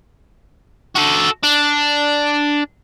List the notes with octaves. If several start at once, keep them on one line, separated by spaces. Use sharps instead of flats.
F#4 A4
D4